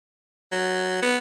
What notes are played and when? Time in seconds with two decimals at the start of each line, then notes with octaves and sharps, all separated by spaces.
0.52 F#3
1.03 B3